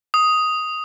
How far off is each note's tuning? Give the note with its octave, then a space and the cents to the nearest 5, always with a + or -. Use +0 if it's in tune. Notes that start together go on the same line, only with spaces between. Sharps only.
D#6 +5